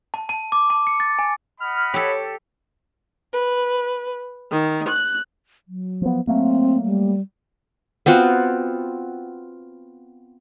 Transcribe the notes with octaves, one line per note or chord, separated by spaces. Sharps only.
A5
A5
D6
A5
C#7
A6
G#5
D#5 F#5 B5 F6
G4 A4 C#5
B4
D#3
F#6
F#3
F3 B3
F#3 A3 A#3 C4
G3
B3 C4 F4 F#4